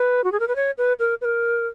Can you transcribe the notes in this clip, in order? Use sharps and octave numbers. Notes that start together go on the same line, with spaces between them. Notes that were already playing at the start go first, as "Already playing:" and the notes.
Already playing: B4
F#4
G#4
A#4
B4
C#5
B4
A#4
B4
A#4